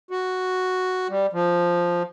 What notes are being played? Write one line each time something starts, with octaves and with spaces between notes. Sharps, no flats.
F#4
G3
F3